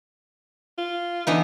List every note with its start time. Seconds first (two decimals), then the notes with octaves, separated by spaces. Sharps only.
0.78 F4
1.27 D3 E3 B3 D#4